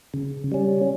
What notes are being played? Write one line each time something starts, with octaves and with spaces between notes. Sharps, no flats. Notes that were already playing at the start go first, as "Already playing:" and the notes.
C#3
G3 C#4